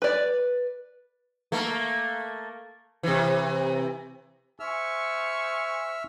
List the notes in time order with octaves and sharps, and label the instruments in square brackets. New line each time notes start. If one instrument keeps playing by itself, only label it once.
[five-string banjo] B4 D5
[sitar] A3 A#3
C3 E3
[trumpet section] C5 G#5 C#6 [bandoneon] E5 E6 F6